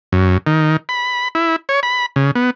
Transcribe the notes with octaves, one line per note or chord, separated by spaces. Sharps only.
F#2
D#3
B5
E4
C#5
B5
C#3
B3